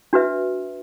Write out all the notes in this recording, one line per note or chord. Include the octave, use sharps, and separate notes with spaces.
D4 F#4 B4 E5